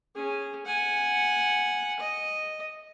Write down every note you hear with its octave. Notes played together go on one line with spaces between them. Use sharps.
C#4 G#4
F#5 G#5
D#5